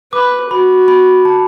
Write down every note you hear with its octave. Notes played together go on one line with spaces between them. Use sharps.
B4 D6
F#4 B5
B5
A5